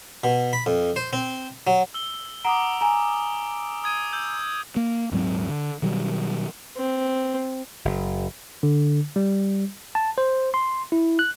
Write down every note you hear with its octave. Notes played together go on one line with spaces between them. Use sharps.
B2
B5
F2
C5
C4
F#3
E6 G7
F#5 A#5 D6 D#6 D7
G#5 A#5
D#6 G#6 D#7
E6 G6
A#3
D#1 G#2 F#3 C4
D3
B2 D#3 F#3 G3
C4
F#1
D3
G3
A5
C5
C6
E4
F#6